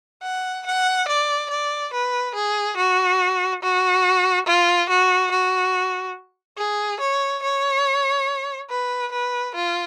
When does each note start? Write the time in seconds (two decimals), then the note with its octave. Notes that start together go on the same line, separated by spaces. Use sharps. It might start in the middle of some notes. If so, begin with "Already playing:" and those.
0.23 F#5
0.66 F#5
1.08 D5
1.50 D5
1.93 B4
2.35 G#4
2.77 F#4
3.63 F#4
4.47 F4
4.89 F#4
5.32 F#4
6.58 G#4
7.01 C#5
7.43 C#5
8.70 B4
9.12 B4
9.55 F4